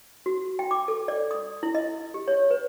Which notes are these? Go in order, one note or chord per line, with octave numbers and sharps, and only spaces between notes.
F#4
G5
D6
A4
D5
D#6
E4
D#5
G4
C#5
B4